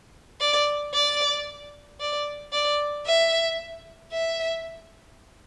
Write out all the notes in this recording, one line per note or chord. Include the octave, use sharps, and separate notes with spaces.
D5
D5
D5
D5
E5
E5